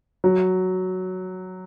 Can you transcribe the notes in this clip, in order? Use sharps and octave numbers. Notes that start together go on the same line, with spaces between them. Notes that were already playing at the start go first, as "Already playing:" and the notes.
F#3